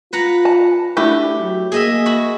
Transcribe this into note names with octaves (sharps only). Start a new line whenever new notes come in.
F4 B4 F#5 A#5
A5
A3 D4 E4 F#4 G4
F#3
A#3 G#4 D#5 E5
F#4 B5